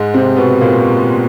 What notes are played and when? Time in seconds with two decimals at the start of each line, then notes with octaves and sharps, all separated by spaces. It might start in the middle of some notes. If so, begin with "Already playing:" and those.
Already playing: G#2 G#3
0.14 C3 C4
0.37 B2 B3
0.61 A#2 A#3